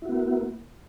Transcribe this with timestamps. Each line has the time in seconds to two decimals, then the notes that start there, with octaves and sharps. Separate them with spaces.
0.02 E4
0.05 F#4
0.09 B3
0.12 A#3